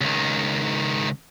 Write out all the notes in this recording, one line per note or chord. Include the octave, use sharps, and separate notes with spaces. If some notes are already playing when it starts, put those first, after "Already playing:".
C#2 D#3